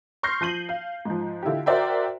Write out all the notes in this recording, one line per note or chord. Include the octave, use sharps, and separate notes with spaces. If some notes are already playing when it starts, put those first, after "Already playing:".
C6 C#6 F6 G6 A#6 C7
F3 G6 D#7 F#7
F5
G#2 F3
D3 E4 F4 G4
F#4 A#4 C5 D5 E5 G5